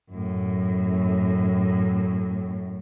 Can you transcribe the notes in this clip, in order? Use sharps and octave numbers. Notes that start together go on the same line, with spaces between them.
F#2 A2